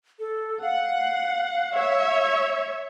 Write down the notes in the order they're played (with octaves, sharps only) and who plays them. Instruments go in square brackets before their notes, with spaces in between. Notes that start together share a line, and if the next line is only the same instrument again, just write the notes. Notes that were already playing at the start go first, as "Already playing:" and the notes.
[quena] A4
[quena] F5 [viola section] F#5
[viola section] C#5 E5